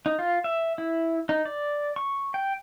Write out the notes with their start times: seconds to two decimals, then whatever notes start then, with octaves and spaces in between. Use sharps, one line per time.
0.06 D#4
0.19 F4
0.44 E5
0.78 E4
1.29 D#4
1.45 D5
1.96 C#6
2.34 G5